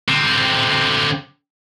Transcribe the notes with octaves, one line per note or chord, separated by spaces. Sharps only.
D3 C4